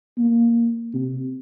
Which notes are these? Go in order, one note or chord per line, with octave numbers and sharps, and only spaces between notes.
A#3
C3